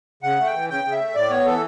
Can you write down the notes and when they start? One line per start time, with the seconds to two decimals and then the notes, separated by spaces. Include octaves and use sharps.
0.23 C#3 F#5
0.39 A3
0.46 G5
0.54 E3
0.69 C#3 G5
0.84 C#3
0.92 E5
1.00 A3
1.15 A2 D5
1.30 B3 C#5
1.46 E3 A4